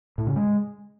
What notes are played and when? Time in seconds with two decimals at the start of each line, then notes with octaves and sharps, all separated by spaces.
0.18 A2
0.27 C#3
0.36 G#3